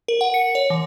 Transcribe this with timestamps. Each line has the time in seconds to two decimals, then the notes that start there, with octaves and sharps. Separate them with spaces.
0.08 A#4
0.21 F#5
0.34 C#7
0.55 C#5
0.70 E3